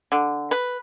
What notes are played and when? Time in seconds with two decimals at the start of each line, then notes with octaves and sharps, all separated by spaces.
0.12 D3
0.51 B4